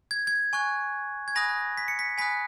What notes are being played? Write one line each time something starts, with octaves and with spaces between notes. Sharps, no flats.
G#6
G#6
G#5 C#6 F#6
G#6
G#5 B5 D#6 F#6 A#6
B6
C#7
B6
G#5 B5 D#6 F#6 B6